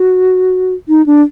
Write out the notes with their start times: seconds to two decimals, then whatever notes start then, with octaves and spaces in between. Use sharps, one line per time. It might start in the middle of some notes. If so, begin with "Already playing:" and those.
Already playing: F#4
0.88 D#4
1.06 D4